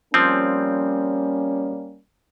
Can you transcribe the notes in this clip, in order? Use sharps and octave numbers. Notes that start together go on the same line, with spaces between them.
F3 G3 A#3 C4 C#4